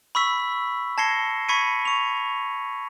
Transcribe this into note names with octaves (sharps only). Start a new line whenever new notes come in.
B5 C#6 E6 B6
A5 G#6 A#6 C7 C#7 G7
B5 C#6 G#6 B6 C#7 D#7
C#6 F7